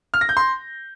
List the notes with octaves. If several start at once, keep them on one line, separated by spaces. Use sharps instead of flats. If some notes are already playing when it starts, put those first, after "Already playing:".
F6
A#6
G6
C6